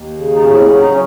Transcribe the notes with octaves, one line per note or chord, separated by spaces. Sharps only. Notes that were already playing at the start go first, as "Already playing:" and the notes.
Already playing: D#2
C#3
D#4
A2 C#4
C4
F#3 C#4
D#4
C#4